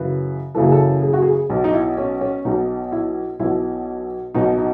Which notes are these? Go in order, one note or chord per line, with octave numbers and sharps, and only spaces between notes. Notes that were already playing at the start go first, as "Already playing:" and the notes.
Already playing: F#2 C#3 E3 B4
F#1 F#2 C#3 E3 A4
G#4
A4
G#4
F#4
G#4
B1 B2
D#4
E4
C#4
C#4
B1 B2 D#4
E4
B1 B2 E4
B1 B2 D#4
D#4